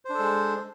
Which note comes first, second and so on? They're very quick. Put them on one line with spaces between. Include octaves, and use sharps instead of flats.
C5 D4 A4 G#3